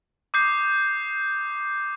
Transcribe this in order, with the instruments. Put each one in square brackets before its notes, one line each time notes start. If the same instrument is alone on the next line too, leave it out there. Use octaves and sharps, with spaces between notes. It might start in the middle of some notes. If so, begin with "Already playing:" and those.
[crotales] D6 D#6 G6 C7